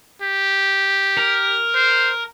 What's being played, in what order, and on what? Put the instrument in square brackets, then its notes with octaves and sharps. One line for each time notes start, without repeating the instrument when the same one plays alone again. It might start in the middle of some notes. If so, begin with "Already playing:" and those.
[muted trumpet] G4
[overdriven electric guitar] A#4
[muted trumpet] C5